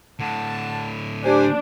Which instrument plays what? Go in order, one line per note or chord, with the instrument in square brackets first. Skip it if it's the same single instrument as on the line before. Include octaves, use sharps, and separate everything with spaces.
[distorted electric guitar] A2 D3 [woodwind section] F#5 A5
[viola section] D4 [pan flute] G4 [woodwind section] C5 G#5